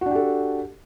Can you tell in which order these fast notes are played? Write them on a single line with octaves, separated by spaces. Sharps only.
F#4 D4 G4 A4